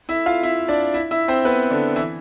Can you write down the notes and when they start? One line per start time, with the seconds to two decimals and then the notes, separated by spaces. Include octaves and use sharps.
0.09 E4 E5
0.26 F4 F5
0.43 E4 E5
0.68 D4 D5
0.94 E4 E5
1.11 E4 E5
1.28 C4 C5
1.45 B3 B4
1.70 D3 D4
1.96 E3 E4